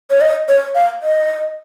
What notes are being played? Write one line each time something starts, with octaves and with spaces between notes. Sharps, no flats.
C#5
D#5
C#5
F5
D#5